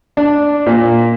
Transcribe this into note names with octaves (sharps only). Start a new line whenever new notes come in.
D4
A#2